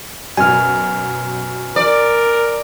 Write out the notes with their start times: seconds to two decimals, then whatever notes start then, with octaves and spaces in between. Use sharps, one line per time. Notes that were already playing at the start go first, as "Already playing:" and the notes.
0.37 F#2 B2 G#5 F6
1.76 A#4 D5